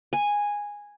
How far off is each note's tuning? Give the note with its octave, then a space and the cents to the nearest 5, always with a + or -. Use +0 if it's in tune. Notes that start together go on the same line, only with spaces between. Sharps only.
G#5 -10